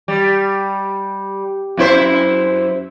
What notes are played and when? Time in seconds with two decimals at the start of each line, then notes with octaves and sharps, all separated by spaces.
0.08 G3
1.77 F#2 E4 C5